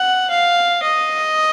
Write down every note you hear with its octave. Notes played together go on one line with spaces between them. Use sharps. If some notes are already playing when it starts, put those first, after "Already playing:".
Already playing: F#5
F5
D#5